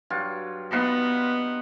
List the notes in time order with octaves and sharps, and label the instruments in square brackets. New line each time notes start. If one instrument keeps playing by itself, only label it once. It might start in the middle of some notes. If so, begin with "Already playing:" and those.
[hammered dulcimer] G2 F#3 F4
[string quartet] B3 [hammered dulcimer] D#4 F4 B4